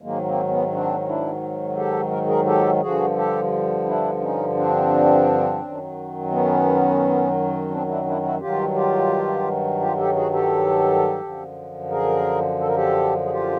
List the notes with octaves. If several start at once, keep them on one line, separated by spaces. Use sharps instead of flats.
G#2 D#3 F#3 G#3 A#3
A#3 C4
B3 C#4
C4 D4
D4 E4
G4 A4
A#4
G#4 A#4
G4 A4
G2 D3 F3 F#4 G#4
G4 A4
D4 E4
C#4 D#4
C4 D4
F#2 D#3 F#3
B3 C#4
C4 D4
D4 E4
D4 E4
E4 F#4
G2 D#3 F#3 F4 G4
F4 G4
F4 G4
G4 A4
F#4 G#4
G4 A4
F#2 D3 F3
G#4 A#4
A4
A#4
G4 A4
G#4
F4 G4